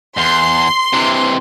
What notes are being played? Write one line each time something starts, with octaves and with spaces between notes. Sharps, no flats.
E2 C6
C3 E3